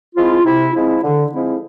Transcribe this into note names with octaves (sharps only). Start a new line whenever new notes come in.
F3 G#3 C4 E4 F4
C3 E4
F3 G#3 C4 E4
D3
F3 G#3 C4 E4